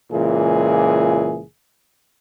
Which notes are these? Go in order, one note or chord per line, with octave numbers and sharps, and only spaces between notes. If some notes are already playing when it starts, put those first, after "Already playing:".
C#2 A#2 E3 G#4